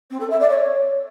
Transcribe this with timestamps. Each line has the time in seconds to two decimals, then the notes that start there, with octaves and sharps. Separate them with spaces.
0.10 C4
0.20 A4
0.30 E5
0.40 D5
0.50 C#5